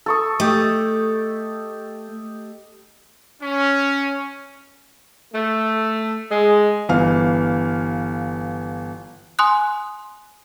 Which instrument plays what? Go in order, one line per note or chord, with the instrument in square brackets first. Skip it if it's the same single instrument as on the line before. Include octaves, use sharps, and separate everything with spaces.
[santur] A4 C#6 D#6
[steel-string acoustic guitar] A3 [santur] G4 D#5
[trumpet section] C#4
[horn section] A3
G#3
[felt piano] G1 E3 F5 F6
[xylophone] G#5 C6 D#6 F#6